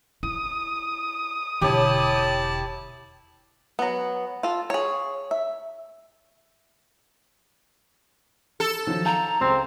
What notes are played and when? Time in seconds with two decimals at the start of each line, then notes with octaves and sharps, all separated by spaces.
0.23 E4 D#6
1.61 E1 D3 E4 G4 C#5 A5
3.79 F#3 B3
4.43 F4 A4
4.70 G#4 C#5
5.31 E5
8.60 A4
8.87 D#3 F3 F#3
9.05 F5 A5 A#5 G6
9.41 C#2 C4